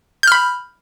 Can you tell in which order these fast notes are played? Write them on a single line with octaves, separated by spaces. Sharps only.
G6 F6 B5